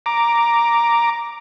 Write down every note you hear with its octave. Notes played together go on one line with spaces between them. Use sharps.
A#5 D6